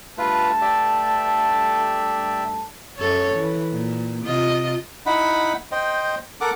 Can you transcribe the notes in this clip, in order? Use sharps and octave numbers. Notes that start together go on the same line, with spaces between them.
G2 A3 F4 B4 A5
G4 D5 E5
F#2 A4 C#5
E3
A#2
C3 F4 D#5
D#4 E4 F#5 B5
C5 D#5 G5
A4 A#4 F#5 D6